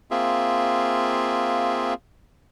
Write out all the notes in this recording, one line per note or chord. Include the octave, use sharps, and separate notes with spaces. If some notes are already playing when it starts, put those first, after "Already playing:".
A#3 C4 F4 G#4 E5